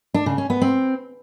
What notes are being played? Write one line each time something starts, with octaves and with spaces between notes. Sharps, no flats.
D4
C#3
C#4
B3
C4